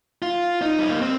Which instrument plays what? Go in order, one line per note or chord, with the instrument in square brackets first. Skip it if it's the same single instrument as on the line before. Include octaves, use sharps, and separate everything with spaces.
[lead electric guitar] F4
D#4
G3
A#3
C4